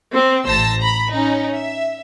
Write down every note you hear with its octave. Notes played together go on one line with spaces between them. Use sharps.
C4
A1 C5 A5 E6 A#6
A#5 B5
C#4 D#4
E5